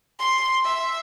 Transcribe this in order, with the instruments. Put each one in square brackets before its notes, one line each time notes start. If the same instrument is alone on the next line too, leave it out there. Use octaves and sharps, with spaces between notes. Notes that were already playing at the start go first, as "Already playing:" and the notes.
[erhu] C6
E5